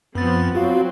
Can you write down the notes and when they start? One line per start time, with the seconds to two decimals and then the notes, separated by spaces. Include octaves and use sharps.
0.15 F#2 F3 B3 C4 A6
0.55 F#3 C4 F4 F#4 F5